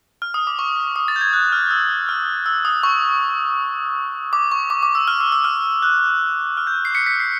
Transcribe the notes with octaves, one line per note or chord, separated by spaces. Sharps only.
F6
D#6
D6
C#6
D#6
A6
G6
G#6
F#6
F6
E6
F6
E6
D#6
C#6
D6
C#6
D6
D6
E6
F6
E6
E6
F6
F#6
F6
G6
C7
B6 C#7
B6 C#7
C7